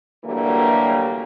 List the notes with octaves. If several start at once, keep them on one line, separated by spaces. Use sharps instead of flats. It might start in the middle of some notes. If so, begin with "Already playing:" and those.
D3 E3 F#3 G3 A3 A#3